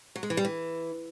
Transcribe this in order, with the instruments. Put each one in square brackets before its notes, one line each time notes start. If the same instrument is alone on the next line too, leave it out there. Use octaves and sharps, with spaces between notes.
[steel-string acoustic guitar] F#3
G#3
E3
G3
E3